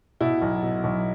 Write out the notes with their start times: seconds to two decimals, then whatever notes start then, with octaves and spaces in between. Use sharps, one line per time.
0.21 B2 E4
0.42 B1
0.63 B2
0.84 B1